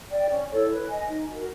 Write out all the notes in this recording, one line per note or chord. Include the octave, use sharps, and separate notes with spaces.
D5 G5
C#4
E4 A4 C#5
B4
D#5 G#5
D#4
F#4 A#4